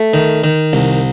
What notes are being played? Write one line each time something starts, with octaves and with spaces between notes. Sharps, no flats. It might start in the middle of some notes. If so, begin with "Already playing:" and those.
Already playing: A3
D#3
D#3
C2